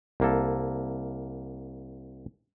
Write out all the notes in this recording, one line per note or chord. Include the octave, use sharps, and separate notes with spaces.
C2 A#3 A4